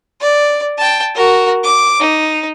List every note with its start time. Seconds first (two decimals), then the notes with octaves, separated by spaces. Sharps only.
0.21 D5
0.78 G5 A5
1.15 F#4 A#4
1.64 D6
2.00 D#4